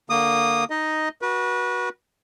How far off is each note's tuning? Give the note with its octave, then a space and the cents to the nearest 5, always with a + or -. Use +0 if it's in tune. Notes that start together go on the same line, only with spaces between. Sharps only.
D3 -5 A#3 +0 D#6 -15
D#4 +0 D#5 +0
F#4 +0 B4 -30